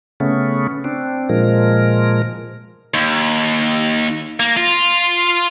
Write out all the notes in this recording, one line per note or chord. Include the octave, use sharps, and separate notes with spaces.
C#3 A3 B3 C#4
C4 D4
A#2 F3 G#3 A#4
D#2
A#3
F4